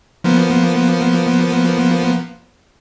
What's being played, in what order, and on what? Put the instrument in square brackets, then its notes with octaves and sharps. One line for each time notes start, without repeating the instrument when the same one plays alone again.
[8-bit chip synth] F3 A#3 B3